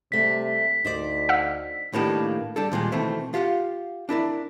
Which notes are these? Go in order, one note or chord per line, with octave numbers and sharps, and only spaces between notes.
C3 G3 A3 B6
D2 D#4 C5 D5
F5 F#5 E6
A2 D#3 A#3 B3 D4 G4
G3 D4 A4
D#2 A#2 G3 G#3
B2 D#3 E3 A3 C4
F4 G4 F5 F#5
D4 E4 A#4 D5